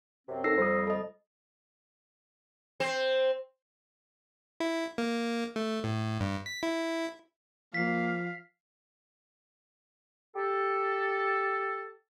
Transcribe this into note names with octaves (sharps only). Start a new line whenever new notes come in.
F#2 C3 C4
D#4 A4 A#4 E6 A#6 C7
F2 G3 C5 D#6
A4 D#5
C4 C5
E4
A#3
A3
A2
G2
B6
E4
F3 A#3 F5 B6 C7
G4 A4